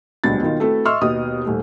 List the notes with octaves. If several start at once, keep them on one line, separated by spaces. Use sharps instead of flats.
D#1 C#2 B2 F#3 D4 A6
B2 D#3 D#4 F4
A3 C4 E4 F#4 A4 B4
D#5 E5 C6 C#6 E6 F6
D#2 B2 B3 D#5 D#6
D#1 A3